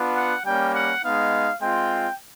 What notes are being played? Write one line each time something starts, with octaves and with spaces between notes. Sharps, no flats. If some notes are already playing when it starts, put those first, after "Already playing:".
Already playing: B3 D4 F4
F#5
G3 A#3 C#4 G5
F#5
G#3 B3 D#4 F5
G#3 C4 F4 G5